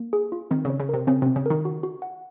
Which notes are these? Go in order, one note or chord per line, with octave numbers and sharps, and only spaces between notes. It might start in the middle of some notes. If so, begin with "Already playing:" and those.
Already playing: A#3
G#4
F4
D#3 C4
C#3 C#5
C#3
C3 A#4
C#3 C4
C3 C4
C#3
D#3 A#4
F#4
F#4
F#5